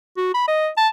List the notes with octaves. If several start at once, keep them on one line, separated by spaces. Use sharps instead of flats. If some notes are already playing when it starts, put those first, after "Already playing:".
F#4
B5
D#5
A5